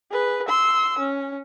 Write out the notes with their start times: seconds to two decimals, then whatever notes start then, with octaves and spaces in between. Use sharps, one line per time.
0.11 G#4 B4
0.48 C6 E6
0.99 C#4